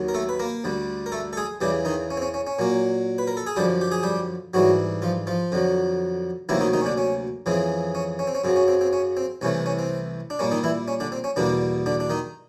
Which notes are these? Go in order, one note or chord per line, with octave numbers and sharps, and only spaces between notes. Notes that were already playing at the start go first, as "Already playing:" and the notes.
Already playing: D#2 D#3 F#3
A#4
A3 A4
B4
A#3 A#4
D2 D3 G3
A#4
A3 A4
A4
G#3 G#4
E2 C#3 E3 G3 G4
D#3 D#4
C#4
C4
C#4
C#4
C#4
A#2 F#3 A#3
B4
A#4
A4
G#4
F#2 D3 F3 G3 G4
G4
G#4
G3 G4
G#2 E3 F#3 G3 F#4
F3 F4
F3 F4
F2 D3 F#3
D2 C3 D#3 E3 F#3 A#3 E4
D#3 D#4
D#3 D#4
C#4
D3 D4
C#4
F2 C#3 E3 G#3 C4
C#4
C#4
C4
C#4
F#2 C#3 F#3 C4
C#4
C4
C4
C#4
C4
C2 C3 E3 A3 C#4
C#4
C4
D4
A#2 G3 A#3 C#4
D#3 D#4
E3 E4
C#4
D3 D4
C4
C#4
E2 B2 D3 G3 A#3 D4
D3 D4
D4
D#3 D#4